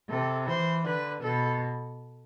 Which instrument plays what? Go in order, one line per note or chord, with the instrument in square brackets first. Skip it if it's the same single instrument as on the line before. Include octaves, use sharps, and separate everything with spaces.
[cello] C3 [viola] A4
[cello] E3 [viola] C5
[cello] D3 [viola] B4
[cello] B2 [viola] A4